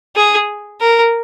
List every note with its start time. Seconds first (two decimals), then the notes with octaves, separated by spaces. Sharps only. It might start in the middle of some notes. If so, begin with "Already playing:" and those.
0.16 G#4
0.81 A#4